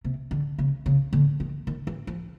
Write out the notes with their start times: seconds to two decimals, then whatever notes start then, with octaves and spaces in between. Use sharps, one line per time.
0.04 C3
0.31 D3
0.59 C#3
0.86 C#3
1.13 D3
1.40 D#3
1.67 D#3
1.87 E3
2.07 F3